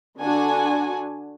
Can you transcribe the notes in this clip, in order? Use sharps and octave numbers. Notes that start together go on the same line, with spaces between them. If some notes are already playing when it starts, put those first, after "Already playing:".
D3 D4 F#4 G#5